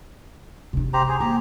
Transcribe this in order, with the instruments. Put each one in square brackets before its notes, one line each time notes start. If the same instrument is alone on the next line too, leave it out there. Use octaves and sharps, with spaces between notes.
[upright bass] C3 D4
[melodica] G4 C5 A#5
G#4 C5
[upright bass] A#3 [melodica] G4 A#5